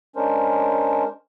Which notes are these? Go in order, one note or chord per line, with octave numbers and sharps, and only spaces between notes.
G#3 C#4 D4 A#4 C5